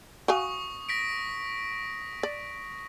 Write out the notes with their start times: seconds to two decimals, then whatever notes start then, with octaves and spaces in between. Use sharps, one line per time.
0.28 F#4 F5 G#5 C#6 D#6
0.89 A#6 B6 D7
2.23 D5